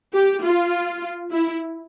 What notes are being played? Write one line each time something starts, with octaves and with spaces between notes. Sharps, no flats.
G4
F4
E4